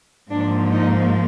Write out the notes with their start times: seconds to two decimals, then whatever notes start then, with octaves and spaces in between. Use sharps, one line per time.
0.30 G#2 F3 A#3 D4
0.71 D#4